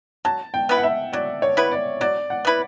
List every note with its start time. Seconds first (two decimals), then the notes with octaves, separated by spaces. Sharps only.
0.25 F#3 A5
0.54 G5
0.69 B3 E4 B4
0.77 F#5
0.83 E5
1.13 F#3 D5
1.42 C#5
1.57 B3 E4 B4
1.72 D5
2.01 F#3 D5
2.30 F#5
2.45 B3 E4 B4